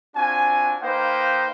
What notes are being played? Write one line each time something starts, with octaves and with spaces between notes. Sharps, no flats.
C4 D4 F4 F#4 G#5
A#3 D#4 B4 C5 F5 G5